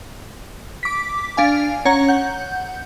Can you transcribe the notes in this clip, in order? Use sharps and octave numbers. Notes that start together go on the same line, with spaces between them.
D6 B6
D4 F5 G#5
C#4 C#5 F#5 A#5
F#5 G6